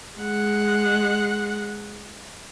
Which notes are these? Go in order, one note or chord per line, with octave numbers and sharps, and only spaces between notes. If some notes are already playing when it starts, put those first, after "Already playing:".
G#3 F#5